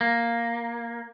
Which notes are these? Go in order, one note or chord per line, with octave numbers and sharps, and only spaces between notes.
A#3